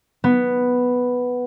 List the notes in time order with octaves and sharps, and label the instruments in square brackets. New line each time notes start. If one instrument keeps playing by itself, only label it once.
[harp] B3